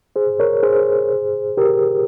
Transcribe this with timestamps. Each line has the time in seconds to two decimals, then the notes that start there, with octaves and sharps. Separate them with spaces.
0.16 G#4 C5
0.40 A#4 C#5
0.63 G#4 C5
1.57 G4 A#4